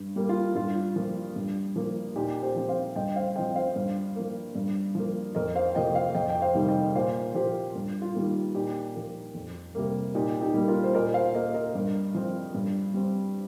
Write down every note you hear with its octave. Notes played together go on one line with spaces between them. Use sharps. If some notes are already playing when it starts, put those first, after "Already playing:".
Already playing: G2
G3 A#3
F4
G2 F4
F3 A#3
G2
F3 A#3
A#2 D#4 G4
G4 C5
F3 C4
C5 F5
G2 D#5 G5
C5 F5
F3 C4 D#5 G5
C5 F5
G2
F3 A#3
G2
F3 A#3
F2 A#4 D#5
C5 F5
C3 F3 A#3 D#5 G5
C5 F5
F2 D#5 G5
G5
C5 F5
C3 D#3 G3
D#5 G5
A#2 C5 F5
F3 A#3 G4 C5
G2
F4
D#3 G3 A#3
A#2 D#4 G4
F3 A#3
F2
C3 G3 A#3
A#2 D#4 G4
D#4 G4
G3 A#3
F4 A#4
C5
A#2 A#4 D#5
C5 F5
A#3 A#4 D#5
A#4 D#5
G2
F3 C4
G2
G3 C4